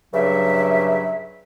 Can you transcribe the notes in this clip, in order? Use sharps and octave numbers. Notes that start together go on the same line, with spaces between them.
G2 C#3 F#3 E5